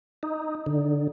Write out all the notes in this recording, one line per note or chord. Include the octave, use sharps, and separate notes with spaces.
D#4
D3